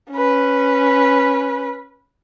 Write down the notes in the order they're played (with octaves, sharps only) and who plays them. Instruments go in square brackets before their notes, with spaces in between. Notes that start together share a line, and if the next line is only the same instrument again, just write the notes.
[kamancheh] C#4 B4